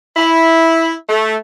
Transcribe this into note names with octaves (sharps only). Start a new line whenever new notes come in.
E4
A3